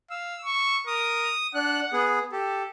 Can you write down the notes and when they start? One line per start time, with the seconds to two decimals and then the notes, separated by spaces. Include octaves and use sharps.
0.10 F5 E6
0.45 C#6
0.87 A#4 D#6
1.55 D4 F#5 F#6
1.93 B3 G#4
2.32 G4 A4